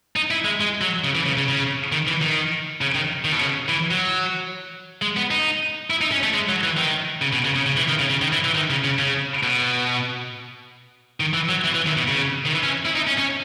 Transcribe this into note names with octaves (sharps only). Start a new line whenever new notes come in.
D#4
E4
G#3
G#3
F#3
C#3
E3
C#3
C#3
C#3
D#3
E3
D#3
C#3
D#3
D#3
B2
C#3
E3
F#3
G#3
B3
D#4
E4
D#4
C#4
A3
G#3
F#3
E3
D#3
C#3
B2
C#3
C#3
C#3
E3
D#3
C#3
C#3
D#3
E3
E3
D#3
C#3
C#3
C#3
B2
D#3
E3
F#3
E3
E3
D#3
B2
C#3
D#3
E3
C#4
E4
D#4
C#4
C#4